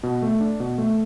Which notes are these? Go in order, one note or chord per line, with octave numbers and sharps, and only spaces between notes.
B2
A3
D4
B2
A3